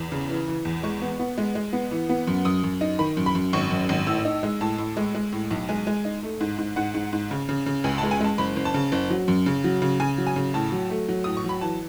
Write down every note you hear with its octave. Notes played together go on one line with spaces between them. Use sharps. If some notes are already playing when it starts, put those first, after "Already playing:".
Already playing: E2
C#3
E3
E3
E2
G#3 C#6
B3
B3
G#3
G#3
B3
E3
B3
F#2
F#2 D#6
F#2
D#4
D#3 B5
F#2
B5
F#2
G#1 C#6
F#2
G#1
A2 E6
D#4
G#3
A2 A5
A2
G#3
G#3
A2
B1
G#3 G#5
G#3
D#4
A3
G#2
G#2
G#2 F#5
G#2
G#2
C#3
C#3
C#3
C#2 G#5
A5
G#3
G#5
G#3 A5
F#1 B5
F#1
A5
C#3
F#1
F#3
F#2
C#3
F#3
C#3
C#3 G#5
F#3
G#5
C#3
A2 A5
F#3
A3
F#3
A2 D#6
C#6
F#3
B5
E3 A5